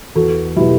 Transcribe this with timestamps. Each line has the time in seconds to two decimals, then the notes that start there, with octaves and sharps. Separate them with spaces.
0.15 E2 F#4 A4
0.56 B2 F#3 E4 G4